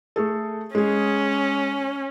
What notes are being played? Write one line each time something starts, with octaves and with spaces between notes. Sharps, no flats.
A3 G#4 A4
G#3 C#4 G#4